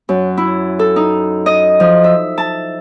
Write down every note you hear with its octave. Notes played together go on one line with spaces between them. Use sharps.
F#2
E4
A4
D#4
D#5
F3
E5
A5